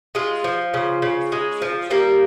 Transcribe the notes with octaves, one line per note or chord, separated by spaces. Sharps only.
G#3 F4
F3
C#3
C#3
G#3
F3
G3 A#3